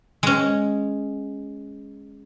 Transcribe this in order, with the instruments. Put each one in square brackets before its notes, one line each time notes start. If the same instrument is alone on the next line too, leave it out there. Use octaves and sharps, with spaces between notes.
[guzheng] G#3 C#4